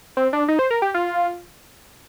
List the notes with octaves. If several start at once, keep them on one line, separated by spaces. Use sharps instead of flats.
C4
D4
D#4
C5
A#4
G4
F4